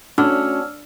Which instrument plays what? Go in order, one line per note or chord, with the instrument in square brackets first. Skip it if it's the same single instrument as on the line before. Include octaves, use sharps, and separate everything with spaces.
[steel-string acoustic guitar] A3 C#4 F#4 [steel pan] D4 [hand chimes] D5 E6 F6